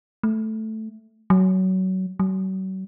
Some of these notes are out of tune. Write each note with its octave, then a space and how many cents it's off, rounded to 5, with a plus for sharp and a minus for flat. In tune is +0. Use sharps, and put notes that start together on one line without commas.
A3 -5
F#3 +20
F#3 +40